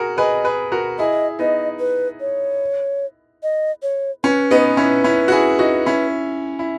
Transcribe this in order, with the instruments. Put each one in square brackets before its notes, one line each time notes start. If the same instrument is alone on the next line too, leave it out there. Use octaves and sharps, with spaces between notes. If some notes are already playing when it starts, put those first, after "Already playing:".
Already playing: [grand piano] F#4 G#4 A#4
[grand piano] G#4 B4 [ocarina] D#5
[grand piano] G#4 B4
F#4 A#4
[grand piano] E4 G#4 [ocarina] D#5
[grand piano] B3 D#4 [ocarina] D#5
[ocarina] B4
C#5
D#5
C#5
[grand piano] C#4 [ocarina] B4
[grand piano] B3 D#4
[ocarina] B4
[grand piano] C#4 E4
C#4 E4
F#4
E4 G#4
D#4 F#4
C#4 E4
E4